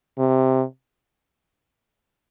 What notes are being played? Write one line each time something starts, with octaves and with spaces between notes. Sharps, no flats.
C3